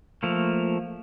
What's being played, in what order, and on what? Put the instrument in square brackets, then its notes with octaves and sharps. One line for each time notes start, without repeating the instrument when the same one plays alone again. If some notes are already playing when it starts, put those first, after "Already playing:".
[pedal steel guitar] F3 A3 A#3